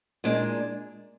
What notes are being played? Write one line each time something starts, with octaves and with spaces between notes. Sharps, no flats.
A#2 G#3 D4